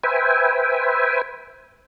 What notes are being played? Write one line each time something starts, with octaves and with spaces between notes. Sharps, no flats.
B4 C5 E5 G5 G#5